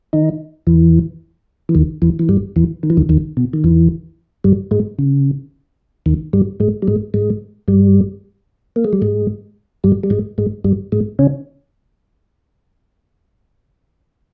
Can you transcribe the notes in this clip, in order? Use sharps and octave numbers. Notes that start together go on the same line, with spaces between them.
D#3 D#4
E2 E3
E3
D#2 D#3
E2 E3
E3
G2 G3
E2 E3
D#3
E3
D#2 D#3
D#2 D#3
B2
D#3
E2 E3
G2 G3
G#2 G#3
C#3
D#2 D#3
G2 G3
G#2 G#3
G3
G#2 G#3
G#2 G#3
G2 G3
A#3
G#3
G3
G#2 G#3
G2 G3
G3
G#2 G#3
G#2 G#3
G2 G3
G#2 G#3
C#3 C#4